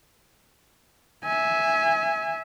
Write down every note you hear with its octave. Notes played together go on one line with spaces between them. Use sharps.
E5 G#5